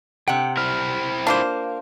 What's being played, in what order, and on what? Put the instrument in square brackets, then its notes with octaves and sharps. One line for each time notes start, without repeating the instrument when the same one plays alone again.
[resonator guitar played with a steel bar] C3 F#5 [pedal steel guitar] G5
[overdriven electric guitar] C4 E4 [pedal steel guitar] F6
[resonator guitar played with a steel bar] A#3 [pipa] D4 F4 C5